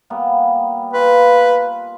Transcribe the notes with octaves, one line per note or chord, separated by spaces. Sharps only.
G3 A#3 B3
F4 B4 G#5